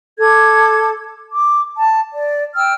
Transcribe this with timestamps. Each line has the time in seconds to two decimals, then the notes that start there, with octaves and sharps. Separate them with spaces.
0.19 A4 D6 G#6
1.29 D6
1.76 A5
2.13 D5
2.55 G5 E6 F6